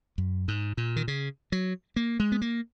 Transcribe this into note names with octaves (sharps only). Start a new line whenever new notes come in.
F#2
G#2
A#2
D#3
C#3
F#3
A#3
G#3
B3
A#3